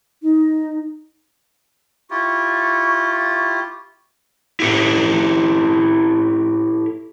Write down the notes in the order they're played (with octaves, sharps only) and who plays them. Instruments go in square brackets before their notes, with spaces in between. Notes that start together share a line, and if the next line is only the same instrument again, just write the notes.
[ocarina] D#4
[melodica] E4 F4 G4 [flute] C#6
[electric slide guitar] E4 G4 A4